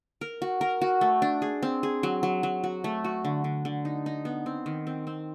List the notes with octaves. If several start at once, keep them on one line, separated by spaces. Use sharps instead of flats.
A#4
F#4
A#4
F#4
A3
D4
G#4
C4
G#4
F#3
F#3
F#3
F#4
A3
F#4
D3
D3
D3
D#4
D#4
B3
C4
D#3
C4
C4